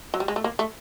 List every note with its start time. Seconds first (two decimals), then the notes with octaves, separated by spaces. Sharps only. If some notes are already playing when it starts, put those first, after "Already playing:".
0.14 F#3
0.20 G3
0.28 G#3
0.36 A3
0.44 A#3
0.59 A3